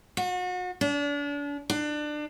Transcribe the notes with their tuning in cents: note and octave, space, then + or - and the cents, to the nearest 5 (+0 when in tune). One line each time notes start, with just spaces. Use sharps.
F#4 -35
D4 -35
D4 +25